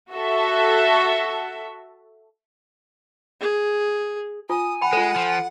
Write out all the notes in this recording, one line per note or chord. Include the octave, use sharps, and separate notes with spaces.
F#4 A4 E5
G#4
F4 G#5 D#6
F#5 G5 B5
G#3 F4 A4
F3